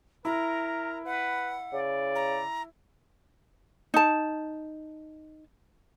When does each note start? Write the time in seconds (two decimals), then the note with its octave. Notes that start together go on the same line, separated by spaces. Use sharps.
0.25 E4 A#4 A#5
1.05 B4 F#5
1.73 C#3 D5
2.15 A#5
3.94 D#4 A5